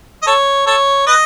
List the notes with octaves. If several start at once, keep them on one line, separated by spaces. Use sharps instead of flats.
D#5
A4 C#5
A4 C#5
B4 D#5